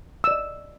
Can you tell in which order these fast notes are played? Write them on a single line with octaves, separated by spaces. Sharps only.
E6 D5 D#5